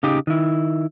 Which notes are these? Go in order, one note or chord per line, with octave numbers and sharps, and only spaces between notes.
C#3 D#4 G4
D#3 E4